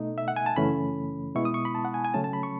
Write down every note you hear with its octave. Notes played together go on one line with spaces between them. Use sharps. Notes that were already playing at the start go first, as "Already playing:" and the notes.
Already playing: B2 A3 D#4
E5
F#5
G#5
A5
F#2 C#3 E3 A3 C#4 B5
B2 G#3 B3 E4 C#6
D#6
C#6
B5
A5
F#5
G#5
G#5
C#3 F#3 A3 C#4 A5
A5
B5
C#6